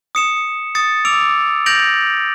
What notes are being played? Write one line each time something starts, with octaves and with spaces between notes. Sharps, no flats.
D#6 C#7 E7
D#6 A6 C#7
D6 E6 D7 F7
G6 A6 A#6 D7 F7 F#7